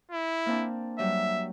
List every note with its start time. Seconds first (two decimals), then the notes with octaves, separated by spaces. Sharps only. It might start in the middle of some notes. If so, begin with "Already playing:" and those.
0.11 E4
0.46 A#3 C4 D4
0.99 F#3 G3 E5